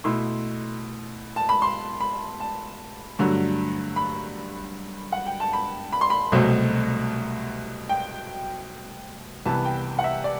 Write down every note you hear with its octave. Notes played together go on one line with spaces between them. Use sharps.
B2 A3 E4 C6
A5
B5
C6
B5
A5
G2 D3 F#3 A3
B5
F#5
G5
A5
B5
B5
C6
B5
C2 B2 F#3 A3 C4
G5
C2 C3 E3 B3 A5
G5
F#5
E5
D5